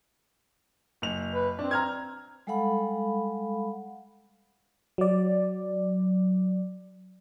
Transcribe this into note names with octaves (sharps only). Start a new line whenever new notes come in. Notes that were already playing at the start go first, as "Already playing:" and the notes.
F#1 F7
B4
C4 D4
A#5 F6 G#6
G3 G#3 A4 F5 F#5 B5
F#3 D5